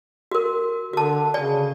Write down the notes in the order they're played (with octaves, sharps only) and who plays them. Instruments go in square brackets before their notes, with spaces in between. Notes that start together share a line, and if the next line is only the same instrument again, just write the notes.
[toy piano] F#4 A#4
[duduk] D3 [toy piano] F#4 A5
[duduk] C#3 [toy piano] D5 G#5